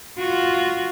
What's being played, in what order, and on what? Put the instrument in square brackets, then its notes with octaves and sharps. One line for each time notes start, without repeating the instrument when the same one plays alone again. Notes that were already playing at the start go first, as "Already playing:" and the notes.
[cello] F4 F#4